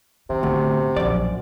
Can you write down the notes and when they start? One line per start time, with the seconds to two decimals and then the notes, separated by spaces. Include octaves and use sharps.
0.30 C3 D#3
0.43 A1 D2 B3
0.96 A#1 F#2 F3 D5